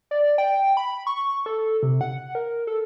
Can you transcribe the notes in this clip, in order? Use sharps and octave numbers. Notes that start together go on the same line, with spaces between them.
D5
G5
B5
C#6
A4
C3
F#5
A#4
A4